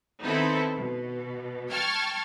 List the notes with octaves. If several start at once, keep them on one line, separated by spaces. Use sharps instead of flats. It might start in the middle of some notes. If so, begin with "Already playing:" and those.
D#3 B3 C4 D#4 E4 A4
B2
G5 A5 C#6 F6 G#6 A6